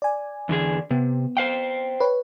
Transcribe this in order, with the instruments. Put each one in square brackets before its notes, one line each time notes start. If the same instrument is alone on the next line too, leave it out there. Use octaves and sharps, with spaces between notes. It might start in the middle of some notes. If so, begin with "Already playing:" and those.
[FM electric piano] D5 G#5
[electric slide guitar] E2 D3 G#4
[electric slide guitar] C3 [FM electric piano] B3
[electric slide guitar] C5 F5 G5
[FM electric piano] B4 C#5